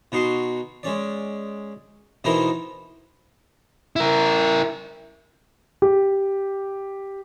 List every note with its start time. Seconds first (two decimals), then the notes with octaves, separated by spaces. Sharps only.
0.12 B2 D#4 F#4 C6
0.83 G#3 C#4 D5
2.24 B2 E3 C4 D#4 E4 A#4
3.96 E4 A#4
5.82 G4